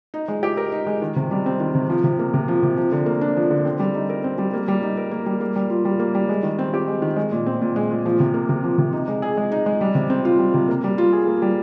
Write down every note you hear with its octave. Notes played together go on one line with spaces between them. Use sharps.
D#4
G#3
G4
A#4
D#4
G#3
D#3
C3
G3
C4
D#3
C3
F3
C3
A#3
C3
F3
C3
F3
D3
A#3
D4
F3
D3
C4
G3
D#4
A#4
C4
G3
A#3
G3
D#4
A#4
A#3
G3
A#3
G3
F4
G3
A#3
G3
G#3
D#3
C4
G4
G#3
D#3
G#3
A#2
C4
A#2
G#3
A#2
F3
C3
A#3
C3
F3
C3
D#4
G#3
G#4
G#3
D#4
G#3
G3
C3
C4
F4
G3
C3
A#3
G3
F4
G#4
A#3
G3